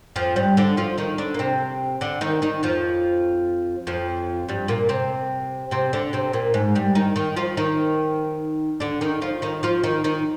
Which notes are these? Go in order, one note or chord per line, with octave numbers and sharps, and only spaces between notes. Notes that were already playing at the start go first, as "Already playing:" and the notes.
F2 F3
G2 G3
D3 D4
F3 F4
D#3 D#4
D3 D4
A#3
C3 C4
D3 D4
D#3 D#4
D#3 D#4
F2 F3
F2 F3
G2 G3
A#2 A#3
C3 C4
C3 C4
D3 D4
C3 C4
A#2 A#3
G#2 G#3
G2 G3
D#3 D#4
D#3 D#4
F3 F4
D#3 D#4
D3 D4
D#3 D#4
F3 F4
D#3 D#4
F3 F4
D#3 D#4
D#3 D#4